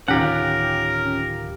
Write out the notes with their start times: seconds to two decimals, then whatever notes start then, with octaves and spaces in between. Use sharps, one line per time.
0.08 D1 D#3 C#4 F4 G4 A#4 F#5